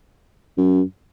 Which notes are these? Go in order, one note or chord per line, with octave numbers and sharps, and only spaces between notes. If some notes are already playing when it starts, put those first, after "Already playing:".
F#2